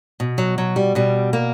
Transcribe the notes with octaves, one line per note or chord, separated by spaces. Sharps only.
B2
F#3
F#3
G3
B2 G3
A#3